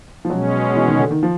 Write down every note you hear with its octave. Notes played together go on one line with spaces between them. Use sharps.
F3
B2 F#3 G#3 C#4
E3
D#3
D3
D#3
F3